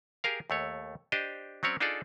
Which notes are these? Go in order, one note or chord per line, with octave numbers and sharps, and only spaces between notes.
G4 G#4 A#4 F5
D#2 A3 C#5
D4 G4 C5 D#5
F#3 C4 C#4 C#5 D5
D4 D#4 F4 G#4 A4 D5